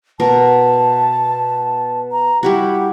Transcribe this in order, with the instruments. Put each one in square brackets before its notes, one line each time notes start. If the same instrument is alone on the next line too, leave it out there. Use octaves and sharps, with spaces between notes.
[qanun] B2 A#4 [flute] A5
[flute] A#5
[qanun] G3 E4 F#4 [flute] G4